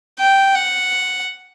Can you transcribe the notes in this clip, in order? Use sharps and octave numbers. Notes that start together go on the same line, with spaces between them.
G5
F#5